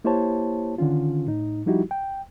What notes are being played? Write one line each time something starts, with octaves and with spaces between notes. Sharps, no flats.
A#3 E4 G4 C5 C#5 A5
D3 D#3 C#4 F4
A2 D#4
F3 G3 D#4 E4 F#4 G4
G5